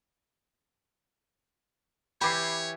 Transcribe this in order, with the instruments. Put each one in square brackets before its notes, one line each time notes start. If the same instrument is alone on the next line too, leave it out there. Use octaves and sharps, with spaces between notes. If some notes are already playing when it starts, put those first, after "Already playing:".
[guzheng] E3 G4 [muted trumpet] C#5 [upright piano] B5 D6 C7